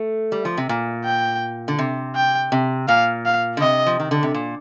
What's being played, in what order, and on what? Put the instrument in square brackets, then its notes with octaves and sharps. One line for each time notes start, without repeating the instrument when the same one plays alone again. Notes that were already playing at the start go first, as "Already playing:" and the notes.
Already playing: [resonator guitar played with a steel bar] A3
G3
F3
C3
A#2
[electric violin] G5
[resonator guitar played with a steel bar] D3
C3
[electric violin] G5
[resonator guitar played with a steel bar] C3
[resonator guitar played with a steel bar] A#2 [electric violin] F5
[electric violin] F5
[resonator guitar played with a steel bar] D3
[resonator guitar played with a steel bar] C3 [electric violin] D#5
[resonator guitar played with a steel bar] F3
D#3
D3
C3
A#2